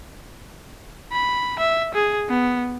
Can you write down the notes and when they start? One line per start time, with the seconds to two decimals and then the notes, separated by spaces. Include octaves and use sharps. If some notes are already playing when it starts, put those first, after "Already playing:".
1.12 B5
1.59 E5
1.94 G#4
2.29 B3